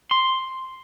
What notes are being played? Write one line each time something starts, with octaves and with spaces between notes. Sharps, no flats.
C6